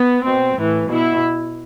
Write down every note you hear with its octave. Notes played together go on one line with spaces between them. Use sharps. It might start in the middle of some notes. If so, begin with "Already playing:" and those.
Already playing: B3
B2 C4
A2 E3
B2 E4